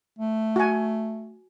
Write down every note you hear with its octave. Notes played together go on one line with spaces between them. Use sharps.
A3
F#4 G#5